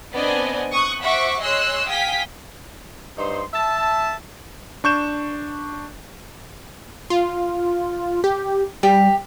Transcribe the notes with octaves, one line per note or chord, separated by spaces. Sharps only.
B3 C4 D4 D5 D#5 G#5
C#6 D#6 F#6
F#4 C5 E5 F#5 C#6 D6
G#4 C#5 D#5 C6 E6 F#6
F5 G5 G#5 D#6 B6
G2 D#4 C5 C6
E5 A5
D4 C#6 G6 E7
F4
G4
G3 G4